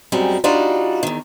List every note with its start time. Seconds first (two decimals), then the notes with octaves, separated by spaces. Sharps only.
0.12 F#2 G3 G#3 C4
0.44 G3 D4 D#4 F4 F#4
1.03 E2 D#3